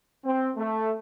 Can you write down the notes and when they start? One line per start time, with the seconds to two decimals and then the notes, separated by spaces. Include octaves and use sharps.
0.25 C4
0.57 A3